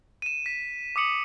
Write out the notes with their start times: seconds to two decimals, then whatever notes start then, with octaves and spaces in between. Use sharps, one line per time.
0.22 D#7 E7
0.46 B6
0.96 D6 D#6 C#7 F#7